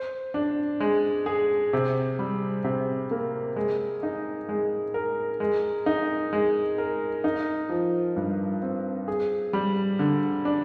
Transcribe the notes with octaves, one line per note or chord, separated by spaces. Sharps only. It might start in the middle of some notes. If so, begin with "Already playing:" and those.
Already playing: C5
D4
G#3
G#4
C3
G3
C3
A#3
G#3
D#4
G#3
A#4
G#3
D#4
G#3
A#4
D#4
F3
G2
C4
G#4
G3
D3
D4